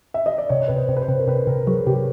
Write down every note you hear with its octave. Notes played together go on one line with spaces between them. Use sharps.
E5
D#5
D5
C3 C#5
C3 B4
C5
C3
B4
C5
C3
A#4
C3 B4
C3 A#4
F#3 G#4
C3 G4